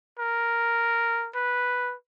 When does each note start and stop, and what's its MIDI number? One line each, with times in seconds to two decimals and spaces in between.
0.19 1.29 70
1.35 1.94 71